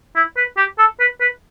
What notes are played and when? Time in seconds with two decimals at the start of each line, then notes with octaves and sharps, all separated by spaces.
0.16 E4
0.37 B4
0.57 G4
0.79 A4
1.00 B4
1.21 B4